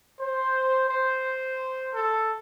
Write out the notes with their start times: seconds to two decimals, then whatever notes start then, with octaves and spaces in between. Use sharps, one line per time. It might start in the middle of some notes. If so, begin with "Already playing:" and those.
0.19 C5
0.89 C5
1.92 A4